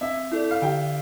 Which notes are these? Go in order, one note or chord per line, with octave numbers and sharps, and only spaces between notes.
C4 E5
E4 A4 D5
F5
D3 G5